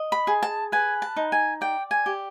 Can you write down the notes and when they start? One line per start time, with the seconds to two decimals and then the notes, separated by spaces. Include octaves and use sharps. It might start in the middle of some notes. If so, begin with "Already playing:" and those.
Already playing: D#5
0.12 B5
0.27 G#4
0.43 A5
0.72 B4 G#5
1.02 A5
1.16 D#4
1.32 G#5
1.61 D5 G5
1.91 G#5
2.06 G4